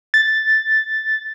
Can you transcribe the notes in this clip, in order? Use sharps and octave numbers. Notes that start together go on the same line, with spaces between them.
A6